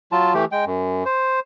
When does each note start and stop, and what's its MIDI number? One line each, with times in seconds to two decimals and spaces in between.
0.12 0.34 54
0.12 0.34 65
0.12 0.34 81
0.34 0.45 52
0.34 0.45 57
0.34 0.45 67
0.52 0.65 56
0.52 0.65 79
0.67 1.04 42
1.06 1.40 72